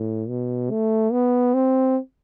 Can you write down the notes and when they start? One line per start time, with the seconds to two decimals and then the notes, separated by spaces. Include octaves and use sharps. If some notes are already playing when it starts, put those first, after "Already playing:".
Already playing: A2
0.29 B2
0.71 A3
1.12 B3
1.54 C4